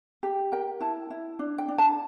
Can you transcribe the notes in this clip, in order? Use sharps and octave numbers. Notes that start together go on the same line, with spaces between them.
G4
A#4 G5
E4 A5
E4
D4
G5
D4
A5